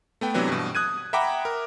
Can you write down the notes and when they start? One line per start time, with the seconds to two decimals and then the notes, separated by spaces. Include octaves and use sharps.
0.21 A3 B3 G5
0.34 C3 E3 F#3 B3 D4
0.48 G2 B2
0.75 D#6 F#6 G#6 D#7
1.13 E5 F#5 G5 A#5 B5 D6
1.45 A#4